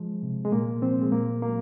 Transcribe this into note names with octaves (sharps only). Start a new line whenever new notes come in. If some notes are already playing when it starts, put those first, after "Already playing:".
Already playing: F3 G#3
C3
G#3
A#2 A#3
F3 C4
G#3
A#2 A#3
F#3 A#3